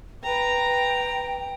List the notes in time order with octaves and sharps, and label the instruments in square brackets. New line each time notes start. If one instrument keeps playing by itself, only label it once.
[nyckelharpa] B4 A#5 [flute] G5